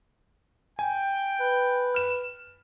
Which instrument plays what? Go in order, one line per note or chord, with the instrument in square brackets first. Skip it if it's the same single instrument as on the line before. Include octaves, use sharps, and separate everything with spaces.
[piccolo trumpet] G5 [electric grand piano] G#5
[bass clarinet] B4
[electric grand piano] F6 E7